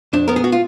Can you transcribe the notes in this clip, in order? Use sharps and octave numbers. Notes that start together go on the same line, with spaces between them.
F2 D4
B3 A#4
G#4
F#4
F4